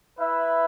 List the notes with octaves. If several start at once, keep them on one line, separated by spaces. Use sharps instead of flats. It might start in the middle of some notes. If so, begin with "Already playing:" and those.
E4 B4 E5